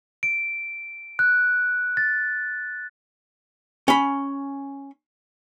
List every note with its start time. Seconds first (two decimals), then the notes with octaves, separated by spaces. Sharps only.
0.23 D7
1.19 F#6
1.97 A6
3.88 C#4 B5